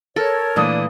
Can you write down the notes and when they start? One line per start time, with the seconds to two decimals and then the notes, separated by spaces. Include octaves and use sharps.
0.16 A4 A#4 C#5
0.56 A#2 E3 A3 D4 D#6